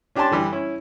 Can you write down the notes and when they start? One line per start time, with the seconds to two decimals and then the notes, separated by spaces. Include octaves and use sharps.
0.15 C#4 D4 G4 G#5 A5 C6
0.31 D3 E3 G3
0.52 C#4 E4